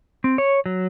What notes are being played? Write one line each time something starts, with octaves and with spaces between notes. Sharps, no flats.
C4
C#5
F#3